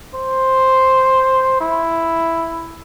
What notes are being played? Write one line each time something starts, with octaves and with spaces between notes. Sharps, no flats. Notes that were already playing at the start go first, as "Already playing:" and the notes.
C5
E4